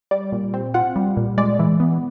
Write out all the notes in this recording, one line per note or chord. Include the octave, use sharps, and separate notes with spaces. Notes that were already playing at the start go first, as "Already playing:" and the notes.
G3 D5
A#2
C4
F4 F#5
G3
A#2
G#3 D5
E3
B3